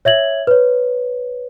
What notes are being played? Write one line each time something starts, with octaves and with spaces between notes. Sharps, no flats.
C#5 E5 G#6 F#7
B4 C#5